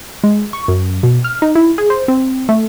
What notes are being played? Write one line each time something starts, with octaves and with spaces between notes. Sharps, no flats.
G#3
C#6
F#2
B2
F6
D#4
E4
G#4
C5
C4
A3